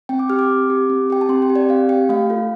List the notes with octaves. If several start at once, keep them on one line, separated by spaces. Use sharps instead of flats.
C4 G5
D6
G4 F6
D6
C4
G4
C4
G4 G5
A5
C4 C6
G5
G4
D5
C4 F5
G4 G5
A3 F5
F4 A4